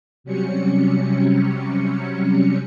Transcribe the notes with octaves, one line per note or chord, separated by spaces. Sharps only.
C3 F#3 G3 C#4 C#7